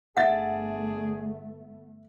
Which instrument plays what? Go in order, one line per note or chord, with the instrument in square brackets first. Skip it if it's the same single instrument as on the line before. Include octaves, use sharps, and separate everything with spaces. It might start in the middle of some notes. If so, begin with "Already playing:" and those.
[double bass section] G1 A3 B3 [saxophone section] D4 G#4 [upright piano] E5 A6 [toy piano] F#5